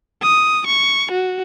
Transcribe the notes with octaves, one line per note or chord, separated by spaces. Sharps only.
D#6
C#6
F#4